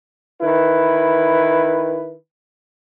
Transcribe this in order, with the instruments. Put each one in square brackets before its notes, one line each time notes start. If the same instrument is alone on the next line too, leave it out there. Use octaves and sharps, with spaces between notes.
[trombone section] D#3 E4 B4